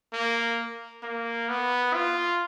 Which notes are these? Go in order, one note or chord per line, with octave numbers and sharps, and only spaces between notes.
A#3
A#3
B3
F4